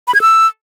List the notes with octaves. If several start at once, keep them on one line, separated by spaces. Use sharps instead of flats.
B5
G#6
E6